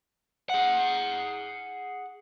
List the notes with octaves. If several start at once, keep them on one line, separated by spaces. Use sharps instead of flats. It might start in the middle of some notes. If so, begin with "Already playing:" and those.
G#4 F#5